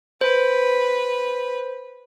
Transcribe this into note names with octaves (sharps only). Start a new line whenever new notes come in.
B4 C5